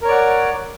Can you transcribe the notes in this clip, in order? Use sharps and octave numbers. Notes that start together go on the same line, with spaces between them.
A#4 C#5 D5 F#5